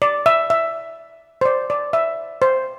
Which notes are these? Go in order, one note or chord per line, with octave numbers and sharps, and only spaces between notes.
D5
E5
E5
C5
D5
D5
E5
C5